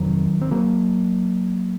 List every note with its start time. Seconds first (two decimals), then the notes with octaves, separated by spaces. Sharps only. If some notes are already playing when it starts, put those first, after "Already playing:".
Already playing: F2 C3 D#3 F#3
0.42 C4
0.51 F#3 A#3